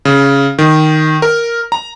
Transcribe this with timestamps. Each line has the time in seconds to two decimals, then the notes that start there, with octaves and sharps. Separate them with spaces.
0.05 C#3
0.59 D#3
1.22 A#4
1.72 A#5